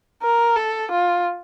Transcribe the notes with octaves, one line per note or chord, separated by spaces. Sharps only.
A#4
A4
F4